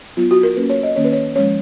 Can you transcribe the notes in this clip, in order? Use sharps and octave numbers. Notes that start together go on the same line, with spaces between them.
F#3 B3 F4
F#4
A#4
F#3 A#3 C#4 B4
C#5
D#5
D#3 A#3 C#4 C#5
B4
C#5
F3 G#3 C#4 C#5